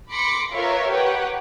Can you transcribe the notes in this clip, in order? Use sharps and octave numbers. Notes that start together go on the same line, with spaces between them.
B5 C6 D6 A#6 C#7
F4 A#4 B4 C#5 E5 F5
G4 B4 C#5 F#5